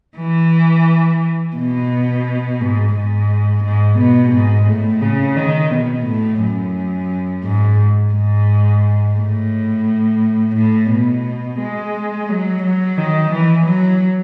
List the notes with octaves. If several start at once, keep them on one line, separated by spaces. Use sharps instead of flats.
E3
B2
G#2
G#2
G#2
B2
G#2
A2
C#3
D#3
B2
A2
F#2
G#2
G#2
A2
A2
B2
G#3
F#3
F#3
D#3
E3
F#3